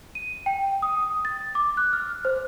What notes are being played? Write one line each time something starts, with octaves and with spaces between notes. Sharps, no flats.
D#7
G5
D#6
A6
D6
F#6
F6
C5